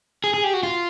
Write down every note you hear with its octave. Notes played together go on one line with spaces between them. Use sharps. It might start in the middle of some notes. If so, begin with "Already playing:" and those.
G#4
G#4
G4
F#4
F4